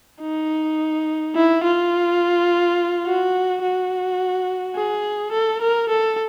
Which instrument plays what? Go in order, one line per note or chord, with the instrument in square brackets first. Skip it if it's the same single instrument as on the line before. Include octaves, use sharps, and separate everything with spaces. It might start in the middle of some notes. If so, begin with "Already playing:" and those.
[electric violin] D#4
E4
F4
F#4
F#4
G#4
A4
A#4
A4